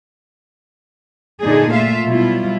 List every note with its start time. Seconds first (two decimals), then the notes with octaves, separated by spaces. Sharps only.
1.42 A#2 D3 D4 D#4 G#4
1.72 A3 F4 E5 F5
2.04 B2 F#3 G3 E4 F4